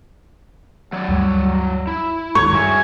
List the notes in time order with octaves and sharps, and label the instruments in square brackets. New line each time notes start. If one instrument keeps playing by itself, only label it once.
[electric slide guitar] F#3 C#5 D5
[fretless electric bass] D2 G2 G3
[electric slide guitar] E4
[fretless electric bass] D#2 G#2 [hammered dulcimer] C#5
[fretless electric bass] G2 [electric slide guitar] F#4 G#4 E5